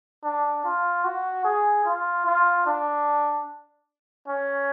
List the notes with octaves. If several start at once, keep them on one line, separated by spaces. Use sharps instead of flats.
D4
F4
F#4
G#4
F4
F4
D4
C#4